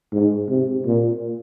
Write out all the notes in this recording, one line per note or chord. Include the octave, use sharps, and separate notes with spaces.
G#2
C3
A#2